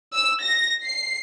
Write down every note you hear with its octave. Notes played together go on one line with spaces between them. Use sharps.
E6
A#6
C7